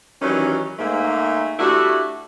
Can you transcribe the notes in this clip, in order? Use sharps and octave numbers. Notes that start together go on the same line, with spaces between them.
D#3 E3 F#3 G3 C#4 D#4
G#2 A3 A#3
G3 A3 D4 E4 F#4